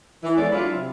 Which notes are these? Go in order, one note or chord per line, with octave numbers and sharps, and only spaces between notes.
E3
G#3 B3 C#4 A4 D5
F#3 D4 E4 F4
C3